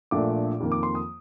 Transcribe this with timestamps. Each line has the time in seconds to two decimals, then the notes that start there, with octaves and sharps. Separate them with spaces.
0.11 A#1 A#2 A3 D4 D6
0.60 F2 D#3 A#3
0.72 D6
0.83 C6
0.95 D#6